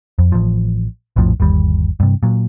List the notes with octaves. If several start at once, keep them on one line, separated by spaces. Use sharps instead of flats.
F2
A1 F3
A#1 F2 A2 F3
G1 D#2 G3
G2 C3
A#2 F#3